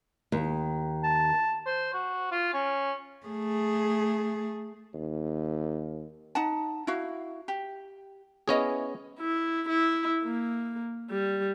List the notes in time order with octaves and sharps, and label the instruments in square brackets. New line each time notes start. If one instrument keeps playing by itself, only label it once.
[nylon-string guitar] D#2
[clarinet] A5
[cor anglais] C5
F#4
F4
C#4
[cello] A3 G#4
[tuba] D#2
[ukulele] D#4 F#5 A5
E4 F#4 F5
G4
[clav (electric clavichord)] B3 C#4 G#4 [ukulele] E4 C#5 D#5
[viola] E4
E4
A#3
G3